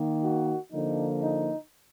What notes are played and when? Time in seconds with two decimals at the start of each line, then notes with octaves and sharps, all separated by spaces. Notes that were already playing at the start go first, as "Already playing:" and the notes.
Already playing: D#3 A#3
0.23 F#4
0.72 D3 F3 A#3 D#4
1.22 D#4